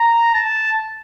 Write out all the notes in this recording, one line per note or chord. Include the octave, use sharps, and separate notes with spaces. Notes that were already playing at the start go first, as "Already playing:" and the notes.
Already playing: A#5
A5